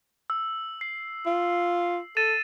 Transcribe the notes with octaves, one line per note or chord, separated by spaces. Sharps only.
E6
C7
F4
A4 A6 D#7 E7